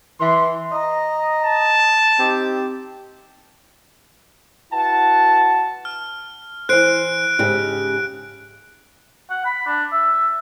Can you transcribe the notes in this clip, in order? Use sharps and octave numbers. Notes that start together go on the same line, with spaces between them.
E3 C6
D#5 A#5
A5
C4 D#4 G4
E4 F#4 B4 F#5 A5
F6
E3 C5 F#6 D7
G#2 C#3 G4
F#5
B5
D4
E5